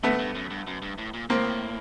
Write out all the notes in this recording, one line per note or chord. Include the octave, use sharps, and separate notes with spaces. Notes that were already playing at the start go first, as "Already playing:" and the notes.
G2 A3 B3
G2
F#2
G2
F#2
G2
A2
A#2
A2 A#3 C4